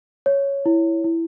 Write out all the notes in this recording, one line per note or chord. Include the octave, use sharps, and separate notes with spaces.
C#5
E4
E4